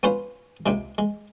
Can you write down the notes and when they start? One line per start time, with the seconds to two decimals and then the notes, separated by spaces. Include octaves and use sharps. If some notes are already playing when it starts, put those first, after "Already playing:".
0.03 B3 C#4 F4 B4 C5
0.66 C#2 C3 G#3
0.98 G#3